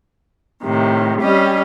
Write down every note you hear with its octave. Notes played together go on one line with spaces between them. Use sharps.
A2 C3 D#3
G3 C#4 G4 D#5